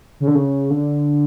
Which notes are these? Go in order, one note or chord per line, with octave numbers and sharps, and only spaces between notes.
C#3
D3
C#3
D3